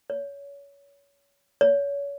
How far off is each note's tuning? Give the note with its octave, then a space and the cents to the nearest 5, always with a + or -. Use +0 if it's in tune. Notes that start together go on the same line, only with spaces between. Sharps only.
C#5 +25
C#5 +30